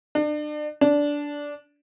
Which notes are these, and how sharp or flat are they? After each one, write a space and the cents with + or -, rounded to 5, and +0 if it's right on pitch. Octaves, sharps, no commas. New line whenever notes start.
D4 +35
D4 -10